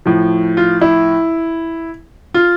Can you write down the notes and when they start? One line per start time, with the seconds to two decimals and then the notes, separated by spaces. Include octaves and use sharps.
0.06 A2 F3
0.57 F4
0.81 E4
2.34 F4